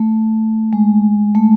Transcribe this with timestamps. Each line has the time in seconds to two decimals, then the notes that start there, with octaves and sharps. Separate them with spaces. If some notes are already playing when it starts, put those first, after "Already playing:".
Already playing: A3
0.73 G#3
1.35 A3